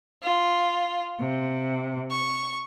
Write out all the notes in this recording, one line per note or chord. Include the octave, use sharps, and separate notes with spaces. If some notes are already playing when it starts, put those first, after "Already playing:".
F4
C3
C#6